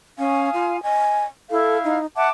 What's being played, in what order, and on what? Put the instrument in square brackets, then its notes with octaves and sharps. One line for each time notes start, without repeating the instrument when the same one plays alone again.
[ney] C#4 [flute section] F5 G#5 D#6
[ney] F4
[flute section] D#5 [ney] G#5
[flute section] E4 F5 [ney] A4
[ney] D#4
[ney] E5 [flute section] F#5 A5 D6